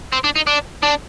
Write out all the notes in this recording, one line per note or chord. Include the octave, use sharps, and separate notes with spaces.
C4
D4
D#4
D4
D4